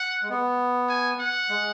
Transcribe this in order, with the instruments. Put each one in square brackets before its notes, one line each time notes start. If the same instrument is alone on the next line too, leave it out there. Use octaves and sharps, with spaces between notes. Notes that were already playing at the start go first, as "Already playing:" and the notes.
Already playing: [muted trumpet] F#5
[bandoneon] G#3
B3
[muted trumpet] G#5
F#5
[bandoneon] G#3